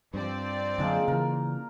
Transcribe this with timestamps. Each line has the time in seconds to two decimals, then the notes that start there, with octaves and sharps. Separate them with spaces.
0.14 G2 F3 C4 D5
0.78 F#2 A#2 D3 G#3 A5
1.08 C#3 E3 A#4